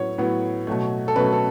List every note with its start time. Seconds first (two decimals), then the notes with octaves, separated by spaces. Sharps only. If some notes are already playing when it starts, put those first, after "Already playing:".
Already playing: A2 F#3 B3 C#5
0.18 A2 F#3 B3
0.67 B2 F#3 A3
1.08 A4
1.16 B2 F#3 A3 B4
1.33 A4